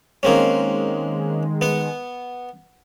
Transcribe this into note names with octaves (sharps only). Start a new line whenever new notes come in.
D#3 G#3 A#3 C4 C#4
B3 F#5